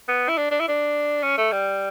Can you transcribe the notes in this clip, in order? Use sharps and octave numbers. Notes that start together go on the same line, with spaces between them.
B3
E4
D4
D4
E4
D4
C#4
A3
G3